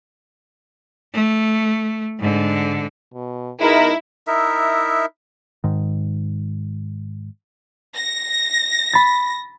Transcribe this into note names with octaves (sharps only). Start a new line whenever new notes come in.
A3
G#2 D3
B2
B2 G#3 D#4 E4 A#4
D#4 E4 A#4 E5
G#2 D#3
A#6
B5 A6